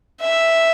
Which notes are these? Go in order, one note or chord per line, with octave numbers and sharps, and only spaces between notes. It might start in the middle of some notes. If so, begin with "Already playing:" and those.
E5